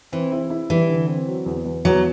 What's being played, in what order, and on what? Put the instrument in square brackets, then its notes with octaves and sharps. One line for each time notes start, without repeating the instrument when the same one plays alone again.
[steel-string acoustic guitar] E3 [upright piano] C4
[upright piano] E4
E4
[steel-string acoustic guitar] E3 [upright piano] G3
[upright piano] D3
C4
F#3
E2
E2
[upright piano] E2 [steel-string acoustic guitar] F#3